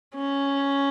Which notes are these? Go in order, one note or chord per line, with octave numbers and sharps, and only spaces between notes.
C#4